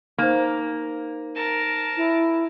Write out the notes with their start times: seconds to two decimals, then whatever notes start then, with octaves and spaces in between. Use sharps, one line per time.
0.18 A#3 D#4 C5
1.35 A#4 A5
1.97 E4